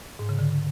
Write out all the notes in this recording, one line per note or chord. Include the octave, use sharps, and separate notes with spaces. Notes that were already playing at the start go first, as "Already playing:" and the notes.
G#2
C#3
D3